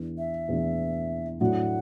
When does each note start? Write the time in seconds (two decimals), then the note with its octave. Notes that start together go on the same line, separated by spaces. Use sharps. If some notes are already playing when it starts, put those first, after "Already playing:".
Already playing: E2 E3 D4
0.18 E5
0.48 E2 E3 D4
1.41 A2 F#3 D4 F#4 F#5